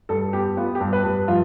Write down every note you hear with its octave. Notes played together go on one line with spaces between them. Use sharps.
G2 A4
B3 G4
B3 F4
G4
G2
B4
G2
F3 F4